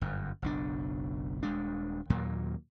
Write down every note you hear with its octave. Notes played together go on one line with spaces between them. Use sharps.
G1 F#2
F#1 B1 D4
D#1 G#3 D4
D#2 A#2 F#3 A#3